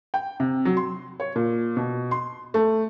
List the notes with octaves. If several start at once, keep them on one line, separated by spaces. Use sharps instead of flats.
G5
C3
F#3
C6
C#5
A#2
B2
C6
A3